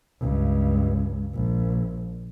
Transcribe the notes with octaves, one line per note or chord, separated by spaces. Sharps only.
C#2 G2
A#1